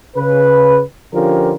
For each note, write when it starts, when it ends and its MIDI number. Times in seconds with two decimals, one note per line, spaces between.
0.17 0.81 49
0.17 0.81 71
1.14 1.53 50
1.14 1.53 53
1.14 1.53 61
1.14 1.53 65
1.14 1.53 67
1.14 1.53 70